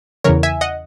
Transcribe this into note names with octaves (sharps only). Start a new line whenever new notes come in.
E2 C#3 E3 A#4 C#5
E5 G#5
D#5 F#5